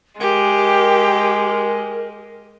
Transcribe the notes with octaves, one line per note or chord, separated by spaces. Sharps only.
G#3 G4 A#4